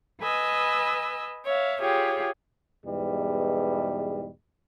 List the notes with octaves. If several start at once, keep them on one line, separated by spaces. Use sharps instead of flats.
B4 D#5 G#5 E6
C#5 E5 F5
F4 G4 G#4 C#5 G5
E2 G#2 B2 G3